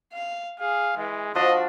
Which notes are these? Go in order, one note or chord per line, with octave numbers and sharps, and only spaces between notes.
F5
G#4 F5
E3 G#3
F3 D4 F#4 D#5